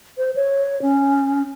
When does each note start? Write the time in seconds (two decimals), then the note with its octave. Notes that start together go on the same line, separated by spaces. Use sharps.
0.18 C5
0.36 C#5
0.82 C#4